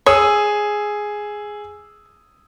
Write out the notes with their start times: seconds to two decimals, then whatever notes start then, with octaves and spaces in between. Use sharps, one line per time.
0.06 G#4 C#5 D#6 E6